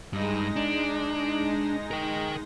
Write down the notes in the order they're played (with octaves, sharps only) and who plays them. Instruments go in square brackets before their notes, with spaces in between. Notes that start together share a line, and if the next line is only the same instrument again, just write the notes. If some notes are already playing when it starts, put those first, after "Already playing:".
[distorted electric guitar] G2 [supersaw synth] G#3 D#4 A#6
[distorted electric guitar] D4
A#4 G5